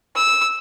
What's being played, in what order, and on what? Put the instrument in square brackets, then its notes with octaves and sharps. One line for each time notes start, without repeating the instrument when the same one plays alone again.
[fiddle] E6